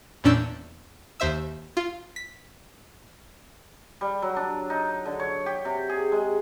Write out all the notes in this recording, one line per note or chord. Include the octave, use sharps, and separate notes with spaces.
E2 A#2 C#4 D4 E6 G6
D#2 C5 E5 E6
F4
B6
G3
F#3
D4
D#4
D3
C#5
G4
C3
G#4
G#3